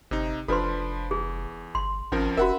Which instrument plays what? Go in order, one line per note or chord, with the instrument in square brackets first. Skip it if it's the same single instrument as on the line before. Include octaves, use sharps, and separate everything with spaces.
[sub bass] G1 [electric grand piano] C3 D#4
[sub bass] F1 [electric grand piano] F3 D4 B5 [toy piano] A4 B4 C6
[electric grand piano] E2 [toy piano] G#4
[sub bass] G1 [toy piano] C6
[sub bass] G#1 [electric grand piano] F2 F3 A#4 [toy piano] C#4
[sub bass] F1 [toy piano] F#4 A#4 [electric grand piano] E5 F#5 B5